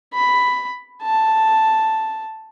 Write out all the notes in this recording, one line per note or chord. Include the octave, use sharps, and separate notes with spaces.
B5
A5